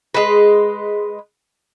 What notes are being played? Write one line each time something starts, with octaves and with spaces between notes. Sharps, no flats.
G#3 B4